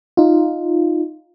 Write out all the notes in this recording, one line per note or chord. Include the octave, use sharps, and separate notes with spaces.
D#4 F4